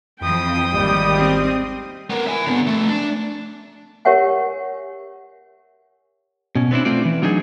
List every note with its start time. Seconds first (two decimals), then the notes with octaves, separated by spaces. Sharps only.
0.21 F2 E3 F3 G5 D#6
0.73 G#1 D#2 G3
1.17 C4
2.10 B3 A#4
2.27 E5 G#5
2.47 D3 B3
2.67 F3 A3
2.88 D4
4.05 G4 A#4 C#5 E5 F#5 G#5
6.55 B2 C#4
6.71 B3 C4 D4 E4
6.85 A3 C4 F4 D5
7.05 E3
7.22 F#3 D4 D#4 F#4 G#4